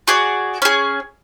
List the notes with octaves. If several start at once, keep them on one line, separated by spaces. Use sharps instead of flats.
F#4 G#4 D5
C#4 G#4